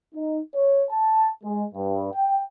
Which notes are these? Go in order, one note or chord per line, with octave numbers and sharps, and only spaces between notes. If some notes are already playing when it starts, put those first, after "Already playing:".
D#4
C#5
A5
G#3
G2
G5